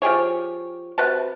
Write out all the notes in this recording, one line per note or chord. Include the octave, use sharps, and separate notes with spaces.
F3 G4 G#4 C#5
C3 F#4 B4 A5